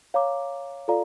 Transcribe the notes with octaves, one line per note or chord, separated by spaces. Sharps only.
C#5 F5 A#5 D6
F4 A4 D5 F5 A#5